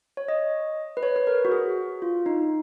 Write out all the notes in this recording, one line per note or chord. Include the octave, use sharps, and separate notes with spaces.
C#5
D#5
B4
C#5
B4
A#4
F#4
G#4
F4
D#4